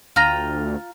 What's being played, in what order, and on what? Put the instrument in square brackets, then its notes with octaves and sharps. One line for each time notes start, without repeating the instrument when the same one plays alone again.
[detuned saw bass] D2 [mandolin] F4 G5 A#5